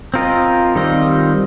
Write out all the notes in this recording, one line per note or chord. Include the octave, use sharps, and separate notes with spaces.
C4 F4 A#4 D#5
D#3 G3 C4 F4 D#5